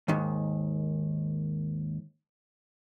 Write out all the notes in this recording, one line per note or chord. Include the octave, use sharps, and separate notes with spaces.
D#2 G#2 D#3